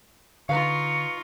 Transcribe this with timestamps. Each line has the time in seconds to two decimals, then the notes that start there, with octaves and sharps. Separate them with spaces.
0.49 D3 D#4 F4 B4 F5 C#6